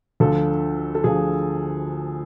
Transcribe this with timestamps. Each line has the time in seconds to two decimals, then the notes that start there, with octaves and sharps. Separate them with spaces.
0.20 D2 D3 F3 A4
0.95 A4
1.04 D2 D3 F3 G#4